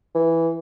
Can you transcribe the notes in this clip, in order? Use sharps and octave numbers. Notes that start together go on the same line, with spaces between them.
E3